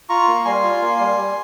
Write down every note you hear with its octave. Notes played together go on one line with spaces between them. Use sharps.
F4 A#5 C#6
A#3
G3 G#5 C6
F4
A#3
G3
G3